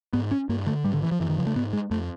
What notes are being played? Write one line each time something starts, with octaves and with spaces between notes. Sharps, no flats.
G#2 B3
C#4
G2 A#3
D3 A3
G#2 G3
D3
E3
F3
F#2 E3
D#3
C#3 F3
A3
G#2 B3
G#3
F2 A3